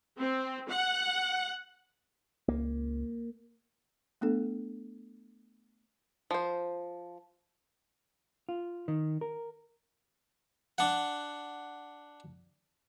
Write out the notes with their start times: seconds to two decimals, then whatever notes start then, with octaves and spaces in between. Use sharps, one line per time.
0.18 C4
0.69 F#5
2.48 C#2 A#3
4.21 A3 B3 D4 A4
6.31 F3 C5
8.49 F4
8.88 D#3
9.21 A#4
10.78 D4 F#5